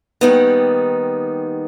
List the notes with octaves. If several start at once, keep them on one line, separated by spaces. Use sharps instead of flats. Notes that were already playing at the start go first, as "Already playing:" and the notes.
D#2 D#3 G3 B3 D#4